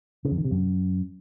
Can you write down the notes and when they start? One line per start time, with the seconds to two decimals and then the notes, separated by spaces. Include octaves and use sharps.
0.25 C#3
0.31 F2
0.38 D#3
0.45 C3
0.51 F#2